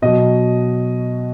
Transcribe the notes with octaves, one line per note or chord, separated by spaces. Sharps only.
B2 F#3 D#5